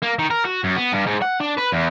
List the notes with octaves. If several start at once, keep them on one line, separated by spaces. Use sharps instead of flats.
A#3
D#3
A#4
F#4
F#2
B3
G2
G#2
F#5
D4
B4
E2